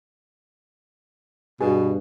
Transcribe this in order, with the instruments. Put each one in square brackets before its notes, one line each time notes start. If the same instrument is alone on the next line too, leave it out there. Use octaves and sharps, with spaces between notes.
[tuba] G2 [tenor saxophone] B2 [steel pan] G#4